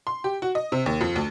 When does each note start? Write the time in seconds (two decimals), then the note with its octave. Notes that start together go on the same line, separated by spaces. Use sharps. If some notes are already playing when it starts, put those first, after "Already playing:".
0.07 C6
0.24 G4
0.42 F#4
0.55 D#5
0.72 C3
0.86 D#2
1.01 F2
1.16 D2